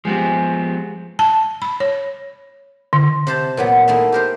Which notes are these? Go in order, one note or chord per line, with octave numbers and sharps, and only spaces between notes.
F3 G#3 B3 C4 G4
A5
B5
C#5
D3
C3 C5 A5
A#2 F#3 B3
A3 A#3 D#4 E4
G4 A#4 C5